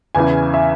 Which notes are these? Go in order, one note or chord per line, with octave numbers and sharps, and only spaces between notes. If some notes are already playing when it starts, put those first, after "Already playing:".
E2 C#3 E3 G#5
E5